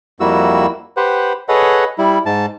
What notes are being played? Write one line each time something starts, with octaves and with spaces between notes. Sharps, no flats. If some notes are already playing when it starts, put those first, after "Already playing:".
F2 G3 A#3 E4 F#4 E6
G4 B4 C5 F#5
G#4 A4 B4 C#5 D#5 F#5
G3 E4
G#2 A5